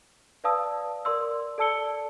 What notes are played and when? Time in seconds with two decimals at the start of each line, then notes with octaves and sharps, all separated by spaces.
0.44 B4 D5 F5 A5 D#6 E6
1.05 A#4 D5 C6 E6
1.58 A4 D5 A5 E6 C#7 G7